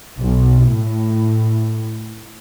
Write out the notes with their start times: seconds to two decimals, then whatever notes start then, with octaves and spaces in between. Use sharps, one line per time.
0.18 B1
0.67 A2